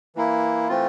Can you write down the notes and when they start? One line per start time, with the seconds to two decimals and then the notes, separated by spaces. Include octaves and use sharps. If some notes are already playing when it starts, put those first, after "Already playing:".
0.16 E3 A#3 E4
0.68 E3 A3 C4 F4